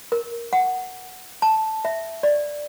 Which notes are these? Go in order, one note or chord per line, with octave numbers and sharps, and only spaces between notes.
A#4
F#5
A5
E5
D5